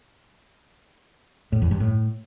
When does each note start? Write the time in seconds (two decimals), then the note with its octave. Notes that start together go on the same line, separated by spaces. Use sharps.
1.52 A2
1.62 E2
1.71 G2
1.80 A2